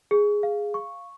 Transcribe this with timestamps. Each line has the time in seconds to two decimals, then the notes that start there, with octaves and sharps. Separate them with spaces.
0.11 G#4
0.43 F5
0.74 C#6